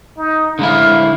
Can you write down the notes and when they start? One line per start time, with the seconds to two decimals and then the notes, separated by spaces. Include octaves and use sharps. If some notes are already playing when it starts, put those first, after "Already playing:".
0.18 D#4
0.59 D3 G#3 E4 F5